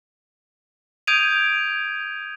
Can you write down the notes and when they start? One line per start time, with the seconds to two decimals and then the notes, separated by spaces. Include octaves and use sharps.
1.07 D#6 G6 G#6 D7 D#7 F7